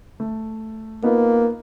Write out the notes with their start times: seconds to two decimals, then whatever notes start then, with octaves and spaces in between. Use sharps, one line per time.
0.20 A3
1.03 A#3 B3 D#4 F4